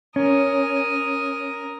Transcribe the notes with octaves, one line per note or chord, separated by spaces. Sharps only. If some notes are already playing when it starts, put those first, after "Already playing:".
C#4 A#4 D#6